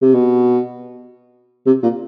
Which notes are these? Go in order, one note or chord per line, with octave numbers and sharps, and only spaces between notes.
C3
B2
C3
A#2